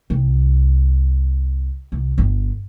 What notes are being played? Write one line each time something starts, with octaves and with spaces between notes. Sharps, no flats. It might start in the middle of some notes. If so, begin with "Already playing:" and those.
C2
C2
G1